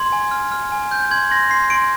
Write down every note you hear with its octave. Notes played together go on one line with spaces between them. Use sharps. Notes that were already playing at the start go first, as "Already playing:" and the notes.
Already playing: C6 G#6
G#5
F6
F6
G#5
G6
C6 G#6
C6 A#6
C6 C7
C6 D7